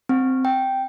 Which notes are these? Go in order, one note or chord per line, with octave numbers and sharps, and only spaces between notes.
C4
G5